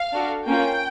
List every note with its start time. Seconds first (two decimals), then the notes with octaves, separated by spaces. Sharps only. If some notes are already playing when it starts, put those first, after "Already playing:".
Already playing: F5
0.13 D4 F#4 A4
0.46 A#3 C#4 F4 G5